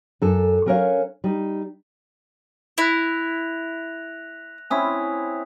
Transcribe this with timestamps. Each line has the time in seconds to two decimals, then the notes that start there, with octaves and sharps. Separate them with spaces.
0.22 F#2 A4 G#5
0.66 F#3 C#4 A#4 B4 C#5 F5
1.24 G3 D#4
2.78 E4 F#6 A#6 F7
4.70 C4 C#4 E4 G#5 D#6 B6